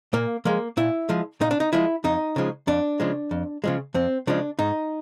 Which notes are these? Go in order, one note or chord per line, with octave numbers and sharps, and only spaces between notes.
A#2 A#3
F3 G#3 A#3
A#2 E4
F3 G#3
A#2 D#4
D4
D#4
F3 G#3 E4
F2 D#4
C#3 F3 G#3
F2 D4
C#3 F3 G#3
F2
C#3 F3 G#3
F2 C4
C#3 F3 G#3 D4
G#2 D#4